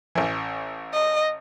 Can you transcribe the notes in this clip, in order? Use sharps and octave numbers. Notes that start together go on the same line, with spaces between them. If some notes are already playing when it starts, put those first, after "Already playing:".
A1 E3
D#5